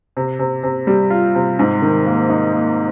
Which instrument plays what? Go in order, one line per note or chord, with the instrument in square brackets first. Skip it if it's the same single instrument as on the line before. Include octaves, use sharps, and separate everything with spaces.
[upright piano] C3
C3
C3
G3
F4
C3
G#2
D#3
A#3
D#4
A#3